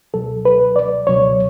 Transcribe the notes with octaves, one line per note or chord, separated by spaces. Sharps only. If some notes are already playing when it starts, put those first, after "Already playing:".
C#2 B2 F#3 A4
B4
D5
C#2 B2 F#3 C#5